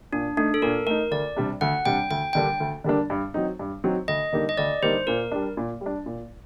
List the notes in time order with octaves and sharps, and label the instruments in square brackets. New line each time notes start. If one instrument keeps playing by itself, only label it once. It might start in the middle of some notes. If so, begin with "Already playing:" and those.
[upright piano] A#2 [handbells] D4
[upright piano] A3 D#4 [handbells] D4
[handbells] A4
[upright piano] A#2 [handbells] A#4
[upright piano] A3 [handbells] A#4
[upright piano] D#4
[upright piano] D2 [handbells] D5
[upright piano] C3 G3 D4
[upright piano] D2 [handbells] F#5
[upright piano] C3 G3 D4 [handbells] G5
[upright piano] D2 [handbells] G5
[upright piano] D3 G3 A#3 D4 [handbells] G5
[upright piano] D2
D3 G3 A#3 D4
G2
F#3 C4 D#4
G2
F#3 C4 D#4
[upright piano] D2 [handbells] D#5
[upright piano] D3 G3 A#3 D#4
[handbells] D#5
[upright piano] D2 [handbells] D5
[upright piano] D3 G3 A#3 D#4 [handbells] C5
[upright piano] A#2 [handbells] A#4
[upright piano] G3 D4
A#2
G3
D4
A#2